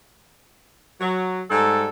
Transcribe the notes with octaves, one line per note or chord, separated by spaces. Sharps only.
F#3
G#2 G3 A4